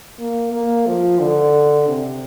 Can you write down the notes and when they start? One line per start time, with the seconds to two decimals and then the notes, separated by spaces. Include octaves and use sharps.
0.19 A#3
0.52 A#3
0.87 F3
1.19 D3
1.88 C3